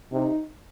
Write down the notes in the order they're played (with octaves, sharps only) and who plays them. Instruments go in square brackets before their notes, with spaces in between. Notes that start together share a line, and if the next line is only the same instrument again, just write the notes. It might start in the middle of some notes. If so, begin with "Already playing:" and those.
[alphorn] C3 [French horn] D#4